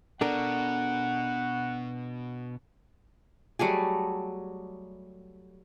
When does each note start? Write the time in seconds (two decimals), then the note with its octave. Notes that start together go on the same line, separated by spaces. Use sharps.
0.21 B2 D4 A4 A#4 F#5
3.59 F#3 G3 A3 G#4